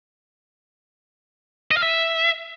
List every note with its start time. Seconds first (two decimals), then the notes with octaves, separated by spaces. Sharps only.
1.71 D#5
1.77 F5
1.83 E5